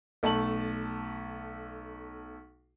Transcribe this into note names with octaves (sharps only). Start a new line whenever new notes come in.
B1 A3 A5 F#7